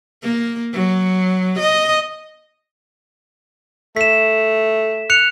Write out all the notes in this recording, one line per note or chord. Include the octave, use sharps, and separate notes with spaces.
A#3
F#3
D#5
A3 B6 E7
F#6 C#7 F7